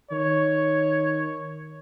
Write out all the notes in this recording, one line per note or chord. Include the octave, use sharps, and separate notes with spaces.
D#3 C#5